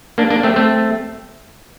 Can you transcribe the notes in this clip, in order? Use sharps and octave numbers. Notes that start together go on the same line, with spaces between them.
A#3 D4
A#3 D4
A3 C4
A3 C4